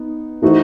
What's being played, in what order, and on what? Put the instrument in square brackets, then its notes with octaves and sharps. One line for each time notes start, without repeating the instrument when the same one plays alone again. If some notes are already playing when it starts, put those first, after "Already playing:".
Already playing: [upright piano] B3 D#4
E3 A3 D#4 F#4 C5